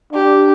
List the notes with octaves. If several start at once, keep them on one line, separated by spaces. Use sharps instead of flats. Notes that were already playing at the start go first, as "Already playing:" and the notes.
D4 G4